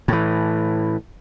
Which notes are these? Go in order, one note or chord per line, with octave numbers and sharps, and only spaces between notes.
A2 E3